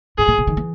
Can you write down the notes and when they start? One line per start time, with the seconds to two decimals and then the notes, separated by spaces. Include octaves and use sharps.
0.18 G#2 G#4
0.28 A#2
0.38 B2
0.47 D#3
0.57 E3